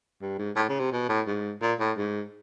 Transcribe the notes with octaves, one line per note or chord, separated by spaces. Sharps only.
G2
G#2
A2
C#3
C3
B2
A2
G#2
A#2
A2
G#2